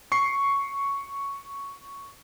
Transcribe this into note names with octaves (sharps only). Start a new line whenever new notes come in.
C#6 C7